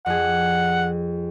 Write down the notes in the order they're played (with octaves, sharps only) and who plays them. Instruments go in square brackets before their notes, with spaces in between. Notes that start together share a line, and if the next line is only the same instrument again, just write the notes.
[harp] F2 G#4 [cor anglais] F#5